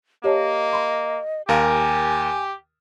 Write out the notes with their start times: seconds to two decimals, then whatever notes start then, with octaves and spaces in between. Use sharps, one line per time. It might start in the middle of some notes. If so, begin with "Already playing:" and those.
0.24 A#3 G4 C#5 D#5 A5
0.73 B5 C6
1.49 D#2 G4 A#4 F5 G#5